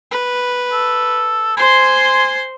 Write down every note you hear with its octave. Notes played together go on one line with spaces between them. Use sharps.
B4
A4
C5 G#5 C6